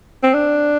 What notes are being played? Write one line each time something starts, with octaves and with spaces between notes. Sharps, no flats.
C4
D4